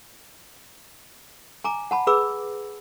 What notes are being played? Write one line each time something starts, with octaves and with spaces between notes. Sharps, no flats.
G#5 A#5 D6
F#5 A5 B5
G#4 B4 B5 D6 E6